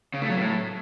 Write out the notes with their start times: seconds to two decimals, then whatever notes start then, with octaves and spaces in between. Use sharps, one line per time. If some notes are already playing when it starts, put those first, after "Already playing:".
0.14 C#3
0.22 A3
0.30 F#3
0.38 A2